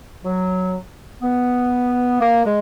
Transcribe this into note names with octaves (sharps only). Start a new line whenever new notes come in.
F#3
B3
A#3
G#3